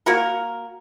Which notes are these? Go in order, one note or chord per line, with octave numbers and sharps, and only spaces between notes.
A#3 F#4 A#4